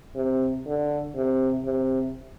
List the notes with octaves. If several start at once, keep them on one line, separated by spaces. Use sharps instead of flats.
C3
D3
C3
C3